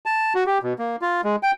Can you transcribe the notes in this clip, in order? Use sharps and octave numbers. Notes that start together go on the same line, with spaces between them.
A5
F#4
G4
B2
A#3
F4
G#3
G5